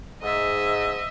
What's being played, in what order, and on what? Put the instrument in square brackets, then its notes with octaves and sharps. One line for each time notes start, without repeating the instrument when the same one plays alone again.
[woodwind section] G#2 [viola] D#5 E5